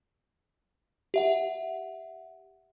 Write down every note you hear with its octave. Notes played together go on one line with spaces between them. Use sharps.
G4 E5 F#5